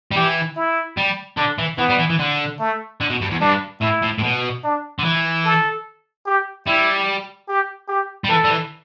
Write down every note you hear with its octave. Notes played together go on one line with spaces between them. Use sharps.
G3
E3 G4
E4
G3
D3 D4
E3
E3 B3
G3
E3
E3
D3
A3
D3
B2
G2
E2
G2 D4
A2 E4
A2
A2
B2
D4
D3
E3
A4
G4
G3 E4
G4
G4
G3
E3 A4
G3
E3